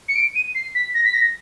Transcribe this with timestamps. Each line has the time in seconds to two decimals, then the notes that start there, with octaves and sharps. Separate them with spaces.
0.09 C#7
0.16 D7
0.35 D#7
0.55 C7
0.75 B6
0.94 A#6
1.05 B6
1.14 A#6